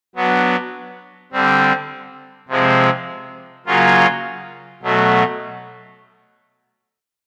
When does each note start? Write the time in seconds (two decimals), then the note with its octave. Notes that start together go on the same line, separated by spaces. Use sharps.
0.15 F#3 B3 D4
1.32 D3 G3 C4
2.48 C3 F3 G#3 C4
3.66 C#3 F#3 A#3 C#4 F4
4.83 B2 F#3 A3